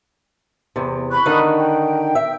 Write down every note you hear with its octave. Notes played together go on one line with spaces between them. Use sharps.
E2 C3
B5 C#6 F#6
D3 D#3 D#4
G5
E5